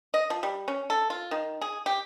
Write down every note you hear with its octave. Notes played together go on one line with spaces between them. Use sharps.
D#5
F3
G3
C#4
A4
F4
D#3
G#4
G4